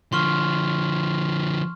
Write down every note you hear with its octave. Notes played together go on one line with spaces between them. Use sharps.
D3 F3 C6 C#6 F6